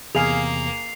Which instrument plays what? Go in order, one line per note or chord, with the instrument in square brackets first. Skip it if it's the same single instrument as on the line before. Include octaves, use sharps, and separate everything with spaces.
[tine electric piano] E2 C3 [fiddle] A#3 [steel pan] G#4 F5 [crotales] C7 F7